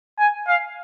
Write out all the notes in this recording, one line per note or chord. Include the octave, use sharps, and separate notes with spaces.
G#5
F5